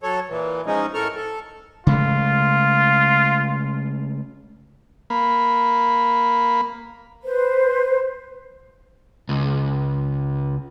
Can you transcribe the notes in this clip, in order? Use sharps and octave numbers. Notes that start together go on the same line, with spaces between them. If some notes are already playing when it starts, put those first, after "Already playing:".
F#3 A4 C#5
A#2 E3
F3 G#3 C#4 D#4
A2 A4 A#4 C#6 F6
A4
C#3 G#3 A3 F4
A#3 B5
B4 C5
C#2